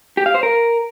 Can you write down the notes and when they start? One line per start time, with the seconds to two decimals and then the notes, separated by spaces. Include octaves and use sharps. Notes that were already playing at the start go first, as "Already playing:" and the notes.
0.17 G4
0.26 F5
0.34 C5
0.43 A#4